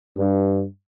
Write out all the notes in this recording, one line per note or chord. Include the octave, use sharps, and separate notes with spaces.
G2